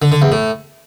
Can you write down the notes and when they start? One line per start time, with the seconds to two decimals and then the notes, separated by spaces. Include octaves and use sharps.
0.02 D3
0.12 D3
0.22 E2
0.32 A2